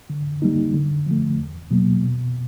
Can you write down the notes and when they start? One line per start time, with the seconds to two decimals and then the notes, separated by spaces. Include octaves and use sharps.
0.10 D3
0.42 G3 A#3 D#4
0.74 D3
1.06 F3 A3
1.38 E2
1.71 B2 F#3 A#3
2.03 B2